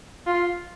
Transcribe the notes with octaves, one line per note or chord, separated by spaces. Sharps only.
F4